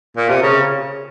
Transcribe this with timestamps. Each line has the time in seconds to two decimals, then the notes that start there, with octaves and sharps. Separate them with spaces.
0.17 A#2
0.29 C3
0.43 C#3